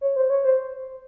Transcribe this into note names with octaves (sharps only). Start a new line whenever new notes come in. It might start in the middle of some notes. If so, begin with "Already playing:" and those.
C#5
C5
C#5
C5